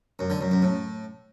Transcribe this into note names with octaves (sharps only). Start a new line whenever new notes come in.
F#2
D3
F#2
F#2
A2